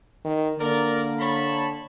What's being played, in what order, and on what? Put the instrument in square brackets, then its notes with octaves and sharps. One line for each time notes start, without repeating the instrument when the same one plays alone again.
[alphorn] D#3
[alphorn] D3 [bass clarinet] A#3 [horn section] A#4 D5
[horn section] C#5 A5 B5